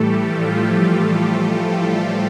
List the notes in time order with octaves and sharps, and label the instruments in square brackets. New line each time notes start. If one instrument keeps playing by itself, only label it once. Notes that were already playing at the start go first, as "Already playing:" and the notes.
Already playing: [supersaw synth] A2 E3 G3 A3 G4 A4
F3 F4
G3 G4
A3 A4
A3 A4